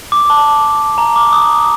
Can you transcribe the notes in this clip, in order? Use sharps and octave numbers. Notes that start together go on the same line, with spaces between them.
D6
A5
A#5
D6
D#6